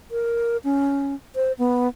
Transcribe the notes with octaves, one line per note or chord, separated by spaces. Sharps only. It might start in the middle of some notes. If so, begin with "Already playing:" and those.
A#4
C#4
C5
B3